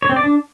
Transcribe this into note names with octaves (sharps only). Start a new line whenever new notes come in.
C#5
C4
D5
D4